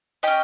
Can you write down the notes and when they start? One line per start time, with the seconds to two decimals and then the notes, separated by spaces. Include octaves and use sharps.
0.23 C#4 G4 D#5 G5